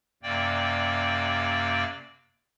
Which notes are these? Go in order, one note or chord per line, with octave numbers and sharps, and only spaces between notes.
F#2 C3 A#3 D5 G5